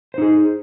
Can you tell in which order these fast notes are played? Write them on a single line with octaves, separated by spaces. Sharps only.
C5 D#4 G#4